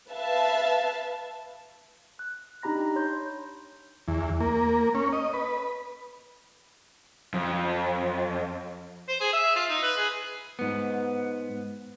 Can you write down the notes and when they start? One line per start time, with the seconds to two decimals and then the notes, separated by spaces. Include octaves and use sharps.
0.10 B4 E5 F5 A5
2.19 F#6
2.63 D4 D#4 G4 A#5 B5 A#6
2.96 C#5 C6 G6
4.08 E2
4.40 A#3
4.95 C#4
5.13 D#5
5.33 B4
7.34 F2
9.08 C5
9.20 G#4
9.33 E5
9.56 F4
9.69 D#4
9.83 B4
9.97 G#4
10.59 G#2 B3